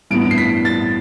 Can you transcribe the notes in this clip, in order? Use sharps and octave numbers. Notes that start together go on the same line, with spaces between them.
A1 G2 E3 B3 D7
C7
B6
A6